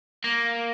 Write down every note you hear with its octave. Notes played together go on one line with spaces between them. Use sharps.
A#3